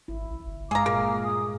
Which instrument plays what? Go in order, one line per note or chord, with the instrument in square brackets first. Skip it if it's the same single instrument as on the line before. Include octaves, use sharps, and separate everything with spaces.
[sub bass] G#1 [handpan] E4
[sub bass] B1
G1
[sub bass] G2 [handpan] G#3 [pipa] G#4 A#5 [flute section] F5 D6 F6
[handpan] A#2 G#4 [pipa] A#4
[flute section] G#5 D#6